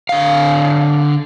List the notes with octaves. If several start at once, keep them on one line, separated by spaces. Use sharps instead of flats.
D3 F5